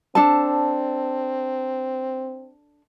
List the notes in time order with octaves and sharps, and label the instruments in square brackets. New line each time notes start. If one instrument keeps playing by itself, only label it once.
[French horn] C4 [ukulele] D4 A4 A5